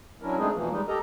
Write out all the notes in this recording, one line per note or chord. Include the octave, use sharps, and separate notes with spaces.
F#3 C#4 D4 E4 A#4
G#3 A3 C4 D4 D#4 G#4
E2 B2 E3 F3 A#3
G3 G#3 D#4
G4 A4 A#4 D#5 A#5